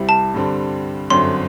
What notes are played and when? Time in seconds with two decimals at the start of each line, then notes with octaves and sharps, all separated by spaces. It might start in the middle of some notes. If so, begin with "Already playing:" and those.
Already playing: C2 C3 G3 C4 E4
0.09 A5
0.34 G2 D3 G3 C4
1.10 G1 F#2 D3 F#3 C4 C6